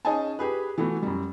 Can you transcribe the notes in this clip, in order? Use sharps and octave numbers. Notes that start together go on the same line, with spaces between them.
C#4 D#4 G#4 D#5 G#5 A5
G4 G#4 B4
E3 A3 B3 F#4
F#2 G3